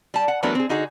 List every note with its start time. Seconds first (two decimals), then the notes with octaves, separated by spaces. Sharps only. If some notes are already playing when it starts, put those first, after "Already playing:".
0.14 G3 A5
0.28 F#5
0.43 E3 F#3 A3 B3 D4 A#4
0.55 C4 G#4
0.69 D3 D#4 F#4 G#4